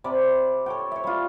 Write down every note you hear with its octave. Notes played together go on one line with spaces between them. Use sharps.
C3 C4 D5 B5
A4 C#5 G5
C#5 E5
G3 F4